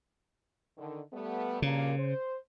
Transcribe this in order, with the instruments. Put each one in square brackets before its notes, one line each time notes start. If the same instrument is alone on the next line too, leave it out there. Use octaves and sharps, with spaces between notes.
[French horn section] D3 D#3
G3 A3 B3
[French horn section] G2 A#2 A#3 [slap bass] C#3
[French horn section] C5